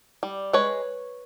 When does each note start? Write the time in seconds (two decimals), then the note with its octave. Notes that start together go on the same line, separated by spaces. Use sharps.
0.23 G3
0.53 G#3 B4 C#5